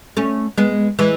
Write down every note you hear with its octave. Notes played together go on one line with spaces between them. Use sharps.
A3 C#4
G#3 B3
E3 G#3